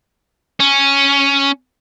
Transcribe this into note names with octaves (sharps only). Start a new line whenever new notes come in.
C#4